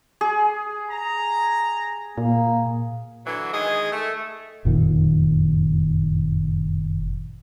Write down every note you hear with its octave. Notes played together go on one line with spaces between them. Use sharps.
G#4
A#5
A#2 A#3
D3 E3 F#3
D#3 G#3 G#4 D#5
A3
F#1 F2 A#2 D#3